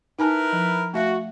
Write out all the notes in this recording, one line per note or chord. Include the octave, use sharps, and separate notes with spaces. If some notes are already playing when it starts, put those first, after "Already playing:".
D#4 E4 A#4 B4 G#5 A5
F3
A3 F#4 E5 F5